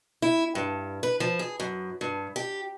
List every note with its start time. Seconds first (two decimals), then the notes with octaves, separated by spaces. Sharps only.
0.22 E4
0.55 G2
1.03 B4
1.20 F3
1.39 G#4
1.60 F#2
2.01 G2
2.36 G4